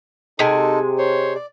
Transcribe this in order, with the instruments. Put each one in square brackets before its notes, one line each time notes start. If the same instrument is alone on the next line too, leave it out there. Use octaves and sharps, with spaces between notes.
[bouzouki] C3 G#3 [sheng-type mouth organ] D#4 A4
[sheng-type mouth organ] C5 C#5
D5